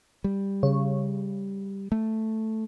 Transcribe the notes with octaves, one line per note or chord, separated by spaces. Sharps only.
G3
C#3
A3